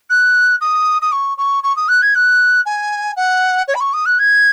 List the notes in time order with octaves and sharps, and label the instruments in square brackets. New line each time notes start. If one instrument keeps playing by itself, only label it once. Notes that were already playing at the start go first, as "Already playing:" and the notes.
[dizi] F#6
D#6
D#6
C#6
C#6
C#6
D#6
F#6
G#6
F#6
G#5
F#5
C#5
B5
C#6
D#6
F#6
G#6